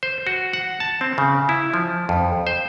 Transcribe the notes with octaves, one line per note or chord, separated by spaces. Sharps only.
C5
F#4
F#5
A5
C4
C#3
E4
F3
F2
C5